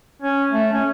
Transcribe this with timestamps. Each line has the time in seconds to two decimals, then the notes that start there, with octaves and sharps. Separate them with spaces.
0.22 C#4
0.52 A3
0.73 C#4